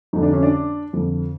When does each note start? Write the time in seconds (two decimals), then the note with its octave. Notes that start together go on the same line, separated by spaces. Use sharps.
0.13 F2 D3 D#4
0.23 D4
0.33 C#4
0.43 D4
0.93 F2 D3